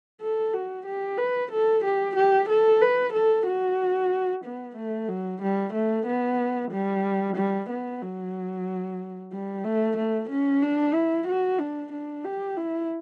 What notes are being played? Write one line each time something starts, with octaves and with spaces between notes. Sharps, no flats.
A4
F#4
G4
B4
A4
G4
G4
A4
B4
A4
F#4
B3
A3
F#3
G3
A3
B3
G3
G3
B3
F#3
G3
A3
A3
C#4
D4
E4
F#4
D4
D4
G4
E4